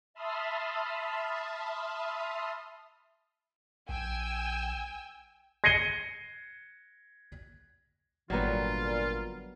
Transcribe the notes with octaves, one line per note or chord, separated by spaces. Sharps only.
E5 A5 B5 C6 D#6 F6
A#1 G5 G#5 E6
G#6 A#6 C7 C#7 D#7 G7
G#1 A#2 D3 F#3 G3 B3 F4 A#5